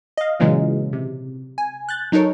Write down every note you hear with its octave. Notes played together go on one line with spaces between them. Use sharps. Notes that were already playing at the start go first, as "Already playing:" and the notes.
D#5 F5
A#2 C#3 E3 F#3 G#3
C3
G#5
F#6 G6 A6
F#3 D#4 A4 A#4 C#5